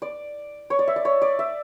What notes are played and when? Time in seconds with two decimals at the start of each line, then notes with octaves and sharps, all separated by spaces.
0.02 D5
0.70 C#5
0.79 D5
0.88 E5
0.96 D5
1.05 C#5
1.22 D5
1.39 E5